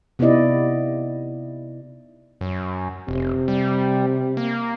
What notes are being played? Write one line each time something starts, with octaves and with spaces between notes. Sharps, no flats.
C3 B3 D#4 E4 D5 D#5
F#2
F1 C3
G3
A#3